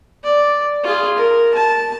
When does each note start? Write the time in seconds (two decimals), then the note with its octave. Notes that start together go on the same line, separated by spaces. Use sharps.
0.24 D5
0.83 F4 G#4
1.16 A#4
1.55 A5